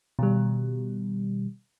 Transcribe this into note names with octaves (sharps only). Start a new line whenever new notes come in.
B2 D#3 G3